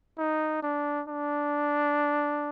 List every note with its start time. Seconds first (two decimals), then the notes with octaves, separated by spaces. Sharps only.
0.18 D#4
0.62 D4
1.08 D4